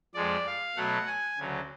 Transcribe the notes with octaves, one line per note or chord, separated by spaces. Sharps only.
F2 F3 G#3 D5
F5
B2 F#3 A3 F#5
G#5
D2 C#3 F#3